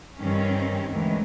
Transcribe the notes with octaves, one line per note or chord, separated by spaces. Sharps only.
G2 D#3 C4 C#4
D2 D#3 E3 G#3